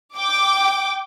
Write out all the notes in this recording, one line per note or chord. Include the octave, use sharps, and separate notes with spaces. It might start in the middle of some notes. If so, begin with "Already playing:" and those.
G5 D6